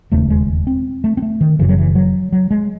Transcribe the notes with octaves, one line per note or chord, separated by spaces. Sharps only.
E1 D#2 C#3 A3
G#3
C4
A3
C4
A3
D#3
F#1 F#2 C#3 E3
F#3
E3
F#3
F#3
G#3